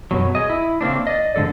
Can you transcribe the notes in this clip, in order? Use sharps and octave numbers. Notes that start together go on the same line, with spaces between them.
F#2 B2 F#3
G#4 D#5
E4
C#3 A#3 C4 D4
D5 D#5
G#2 D3 E3 A4 D5